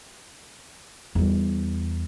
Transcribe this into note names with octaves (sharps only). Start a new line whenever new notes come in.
E2 G3